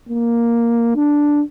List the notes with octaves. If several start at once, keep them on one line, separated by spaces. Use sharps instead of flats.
A#3
D4